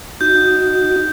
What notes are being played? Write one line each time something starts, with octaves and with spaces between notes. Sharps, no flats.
D#4 F#4 G6